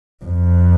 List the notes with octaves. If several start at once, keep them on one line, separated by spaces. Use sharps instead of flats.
F2